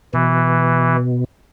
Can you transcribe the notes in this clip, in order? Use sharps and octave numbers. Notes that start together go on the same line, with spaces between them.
B2 E3